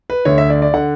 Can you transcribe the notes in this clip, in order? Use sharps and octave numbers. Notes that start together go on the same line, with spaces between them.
B4
D2 D3 C#5
E5
D5
D5
D3 F#5